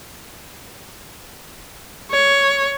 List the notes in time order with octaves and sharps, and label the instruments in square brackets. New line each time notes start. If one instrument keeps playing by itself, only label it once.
[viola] C#5